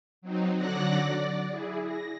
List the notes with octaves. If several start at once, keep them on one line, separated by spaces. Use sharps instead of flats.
F#3 C4 D#4
D3 F#3 D5 F#5 F#6 A#6
D5
E4 G#4
A#6